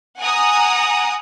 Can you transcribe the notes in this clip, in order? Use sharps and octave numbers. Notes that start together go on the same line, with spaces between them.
F#5 G#5 A#5 D#6